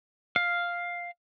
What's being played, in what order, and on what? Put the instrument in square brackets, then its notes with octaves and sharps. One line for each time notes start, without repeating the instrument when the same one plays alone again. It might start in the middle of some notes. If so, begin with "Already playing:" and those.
[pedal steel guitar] F5